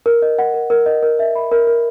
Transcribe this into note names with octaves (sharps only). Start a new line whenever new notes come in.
A#4
D#5
F#5
A#4
A#4
D#5
A#4
E5
B5
A#4
A#4